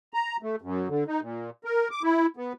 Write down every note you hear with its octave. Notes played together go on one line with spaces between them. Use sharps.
A#5
A3
F#2
D3
D#4
A#2
A#4
D6
E4
B3